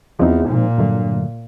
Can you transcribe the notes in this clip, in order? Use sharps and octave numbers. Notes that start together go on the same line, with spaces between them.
E2 F3 G#3 C4 D#4
A#2
G2 D3 F#3 A3